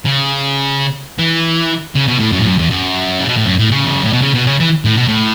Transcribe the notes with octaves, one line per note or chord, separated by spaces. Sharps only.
C#3
E3
C#3
B2
A2
F#2
A2
F#2
E2
F#2
C#3
B2
A2
F#2
A2
C#3
E2
F#2
A2
B2
C#3
B2
C#3
E3
A2
B2
A2